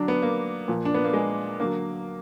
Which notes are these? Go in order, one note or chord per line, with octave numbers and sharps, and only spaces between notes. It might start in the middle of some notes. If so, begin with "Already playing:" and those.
Already playing: D3 F#3 D4
B3
A#3
A#2 F3
D4
B3
A#3
G#3
D3 F#3 A#3